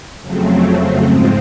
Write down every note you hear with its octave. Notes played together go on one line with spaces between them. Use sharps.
F2 C#3 F#3 A3 C4
G#2 F3 G#3 C4